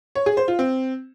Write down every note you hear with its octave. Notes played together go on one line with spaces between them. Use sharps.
C#5
G#4
C5
F4
C4